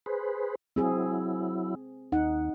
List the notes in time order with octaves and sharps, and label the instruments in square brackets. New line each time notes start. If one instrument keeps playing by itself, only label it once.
[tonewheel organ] G#4 B4 C5
[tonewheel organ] F#3 E4 [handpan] C4 G#4
[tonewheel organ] D#2 [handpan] D#4 F#5